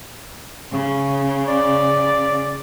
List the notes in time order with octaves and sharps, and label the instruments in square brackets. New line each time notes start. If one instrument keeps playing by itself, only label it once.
[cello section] C#3
[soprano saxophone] D5